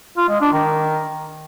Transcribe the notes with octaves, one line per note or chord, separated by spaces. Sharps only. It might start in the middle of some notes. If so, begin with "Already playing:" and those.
F4
G#3
D4
D#3